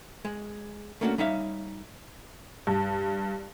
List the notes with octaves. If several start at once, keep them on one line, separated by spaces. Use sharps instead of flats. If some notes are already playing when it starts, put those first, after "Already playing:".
G#3
A3 A#3 C#4 D4 F4 F#4
G3 D#4 C#5 E5 F5
G2